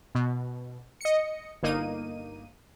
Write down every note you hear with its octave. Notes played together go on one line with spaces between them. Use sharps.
B2
D#5 C#7
G1 A#3 D#4 D#7